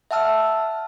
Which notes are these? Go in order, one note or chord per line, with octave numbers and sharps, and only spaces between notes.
E5 F#5 A5 E6 F6